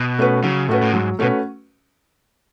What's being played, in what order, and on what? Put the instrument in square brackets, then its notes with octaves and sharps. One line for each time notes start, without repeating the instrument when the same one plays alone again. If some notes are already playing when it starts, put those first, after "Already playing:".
Already playing: [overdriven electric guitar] B2
[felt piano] A3 C#4 F#4 B4
[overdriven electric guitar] C#3 [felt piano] F#3
[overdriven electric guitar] A2 [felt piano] A3 C#4 F#4 B4
[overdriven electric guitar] A2
[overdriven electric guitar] G#2 [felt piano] F#3
[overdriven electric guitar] B2 [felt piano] A3 C#4 F#4 B4